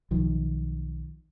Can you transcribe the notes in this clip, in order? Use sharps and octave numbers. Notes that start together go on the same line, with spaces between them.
B1 D#3 F3